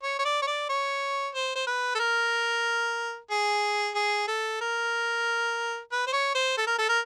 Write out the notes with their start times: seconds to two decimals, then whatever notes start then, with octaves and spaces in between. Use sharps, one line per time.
0.03 C#5
0.19 C#5
0.25 D5
0.42 C#5
0.47 D5
0.69 C#5
1.35 C5
1.55 C5
1.67 B4
1.95 A4
1.99 A#4
3.31 G#4
3.95 G#4
4.28 A4
4.61 A#4
5.92 B4
6.07 C5
6.13 C#5
6.35 C5
6.57 A4
6.67 A#4
6.78 A4
6.89 A#4